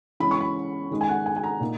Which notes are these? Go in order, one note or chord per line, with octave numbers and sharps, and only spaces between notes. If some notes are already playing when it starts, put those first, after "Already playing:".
E3 G#3 C#4 B5
C#6
B5
D#3 G#3 D#4
G#5
F#5
G#5
G#5
A#5
A#2 A#3 D#4